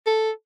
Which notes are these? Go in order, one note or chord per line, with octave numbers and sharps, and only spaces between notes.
A4